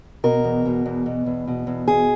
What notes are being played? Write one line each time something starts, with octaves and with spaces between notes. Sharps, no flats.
B2 A#4
E2
B2
E2
B2
E2
B2
E2
B2 G#4